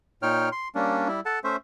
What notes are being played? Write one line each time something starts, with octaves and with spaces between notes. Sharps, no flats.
A#2 D#4 C#5 G5 F6
C6
G3 A#3 C#4 D4
G3 E4
A4 F#5 A5
A3 C#4 C5 E5